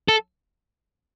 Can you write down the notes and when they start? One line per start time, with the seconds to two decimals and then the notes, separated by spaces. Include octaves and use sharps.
0.08 A4